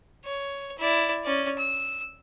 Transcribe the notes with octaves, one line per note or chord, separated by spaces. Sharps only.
C#5
E4 D5
C#4 D5
E6